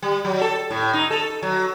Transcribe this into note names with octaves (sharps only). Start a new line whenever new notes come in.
G3
F#3
A4
A2
D#4
A4
F#3